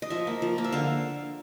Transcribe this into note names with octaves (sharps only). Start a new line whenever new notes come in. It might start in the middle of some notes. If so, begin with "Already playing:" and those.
D#5
F3 E5
A#3
F3
A#3
E5
D3 F5